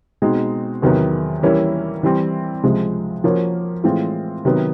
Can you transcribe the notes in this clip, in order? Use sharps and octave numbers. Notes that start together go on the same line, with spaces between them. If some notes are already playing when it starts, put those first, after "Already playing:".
B2 G#3 C4 D#4
E2 C3 D#3 F#3 B3
E3 G3 A#3 C#4 E4
E3 G3 C4
C#2 C3 F3 G#3
F3 A#3 C#4 F#4
A2 E3 G#3 C4 F4
C3 D#3 F#3 B3